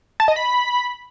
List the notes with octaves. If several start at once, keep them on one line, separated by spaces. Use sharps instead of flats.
A5
D#5
B5